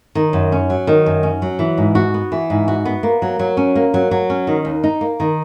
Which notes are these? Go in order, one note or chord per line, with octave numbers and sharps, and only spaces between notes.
D#3
F#2
C#4
F#3
D#3
F#2
C#4
F#3
E3
G#2
F#4
B3
E3
G#2
F#4
B3
A#3
F#3
F#3
C#4
A#3
F#3
F#3
C#4
D#3
D#2
D#4
A#3
D#3